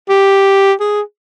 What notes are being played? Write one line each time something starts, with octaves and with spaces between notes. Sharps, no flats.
G4
G#4